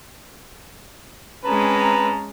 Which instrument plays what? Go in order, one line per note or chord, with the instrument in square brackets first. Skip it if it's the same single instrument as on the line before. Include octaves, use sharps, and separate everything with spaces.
[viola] G#3 C#4 [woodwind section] C4 A5 A#5 [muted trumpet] B4